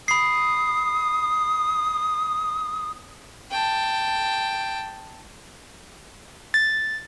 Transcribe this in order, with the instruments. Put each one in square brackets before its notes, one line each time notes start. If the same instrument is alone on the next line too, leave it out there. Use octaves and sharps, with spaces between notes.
[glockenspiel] B5 C7 [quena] D#6
[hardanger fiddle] G5 A5
[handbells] A6